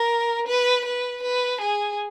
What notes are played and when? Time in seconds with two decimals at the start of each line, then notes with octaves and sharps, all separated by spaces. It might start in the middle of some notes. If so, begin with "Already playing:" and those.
Already playing: A#4
0.47 B4
0.85 B4
1.22 B4
1.60 G#4